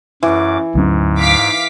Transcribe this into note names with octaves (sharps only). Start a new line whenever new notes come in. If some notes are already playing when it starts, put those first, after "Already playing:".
F#2 E3 D6
D2 G#2 F#3 C#4
F5 D6 B6